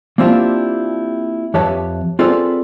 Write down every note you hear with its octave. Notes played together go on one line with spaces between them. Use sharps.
A#3 C4 D4 E4 F4 G4
F2 G4 B4 C#5 E5 A5
C4 F4 G#4 A4 B4 D5